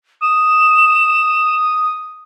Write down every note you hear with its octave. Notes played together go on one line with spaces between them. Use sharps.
D#6 E7